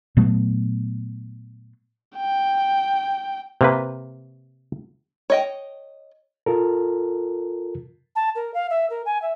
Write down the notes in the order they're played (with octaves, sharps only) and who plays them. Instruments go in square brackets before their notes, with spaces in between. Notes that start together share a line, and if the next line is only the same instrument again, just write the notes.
[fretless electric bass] A#2 F#3 A3 B3
[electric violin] G5
[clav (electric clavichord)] C3 A#3 B4
[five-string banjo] C#5 D#5 G5
[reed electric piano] F4 A4 A#4
[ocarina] A5
A#4
F5
E5
A#4
G#5
E5